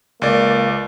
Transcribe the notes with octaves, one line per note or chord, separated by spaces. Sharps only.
C#2 A#3 D5